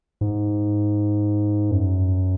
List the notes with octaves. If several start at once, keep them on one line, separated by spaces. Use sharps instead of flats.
G#2
F#2